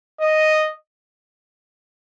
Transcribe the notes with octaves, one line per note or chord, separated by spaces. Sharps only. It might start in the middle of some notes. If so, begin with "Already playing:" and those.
D#5